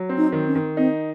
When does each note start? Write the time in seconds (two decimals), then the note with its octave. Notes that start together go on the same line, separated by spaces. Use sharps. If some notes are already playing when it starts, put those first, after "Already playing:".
Already playing: F#3
0.09 C4
0.17 D#4
0.32 D#3
0.48 C#4
0.55 D#3
0.77 C4 D#4